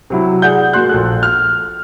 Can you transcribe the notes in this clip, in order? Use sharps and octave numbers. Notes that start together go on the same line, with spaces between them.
C3 F#3 E4
G#4 D5 F#5 G6
A#3 F#4 C6 F#6
A#1 A#2 A4 F#6
F6